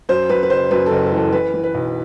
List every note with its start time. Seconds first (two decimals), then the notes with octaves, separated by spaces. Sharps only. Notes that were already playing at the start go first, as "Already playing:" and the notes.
0.09 F#2 C5
0.29 F#2 B4
0.43 B4
0.50 F#1 C5
0.71 F#2 B4
0.86 F#1 A4
1.12 E3 A4
1.32 E3 B4
1.54 E3
1.64 B4
1.74 B1